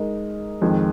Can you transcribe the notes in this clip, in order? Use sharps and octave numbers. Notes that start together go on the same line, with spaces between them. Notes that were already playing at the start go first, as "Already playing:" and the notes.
Already playing: G#3 D#4 A#4 D#5
F2 D#3 G#3